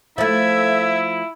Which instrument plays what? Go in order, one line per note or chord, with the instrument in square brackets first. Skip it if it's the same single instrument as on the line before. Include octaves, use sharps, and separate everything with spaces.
[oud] F3 A3 [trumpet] E4 [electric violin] E5 G#6